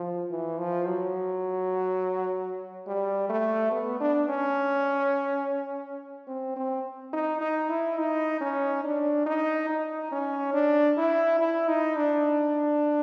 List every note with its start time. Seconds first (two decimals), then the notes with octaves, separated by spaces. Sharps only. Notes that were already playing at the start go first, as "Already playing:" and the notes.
Already playing: F3
0.30 E3
0.58 F3
0.87 F#3
2.86 G3
3.29 A3
3.72 B3
4.00 D4
4.28 C#4
6.27 C4
6.56 C4
7.13 D#4
7.41 D#4
7.70 E4
7.98 D#4
8.41 C#4
8.84 D4
9.26 D#4
9.69 D#4
10.11 C#4
10.54 D4
10.97 E4
11.39 E4
11.68 D#4
11.96 D4